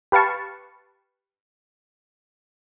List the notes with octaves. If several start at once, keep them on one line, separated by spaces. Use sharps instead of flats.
G4 B4 F5 A5 C#6